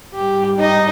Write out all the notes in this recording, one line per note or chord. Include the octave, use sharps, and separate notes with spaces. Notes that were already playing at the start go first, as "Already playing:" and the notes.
G#2 G3 G4
D#4 D#5